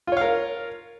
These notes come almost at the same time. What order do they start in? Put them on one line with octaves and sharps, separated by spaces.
F4 C#5 F5 A#4